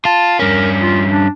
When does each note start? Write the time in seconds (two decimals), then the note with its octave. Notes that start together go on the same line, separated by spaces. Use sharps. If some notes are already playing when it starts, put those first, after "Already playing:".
0.05 F4 A5
0.39 G2 C#4 A#4
0.82 F4
1.09 D4